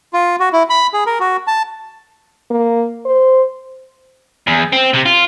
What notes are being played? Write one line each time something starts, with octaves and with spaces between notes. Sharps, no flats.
F4
F#4
E4
B5
G#4
A#4
F#4
A5
A#3
C5
E2
C4
C3
F4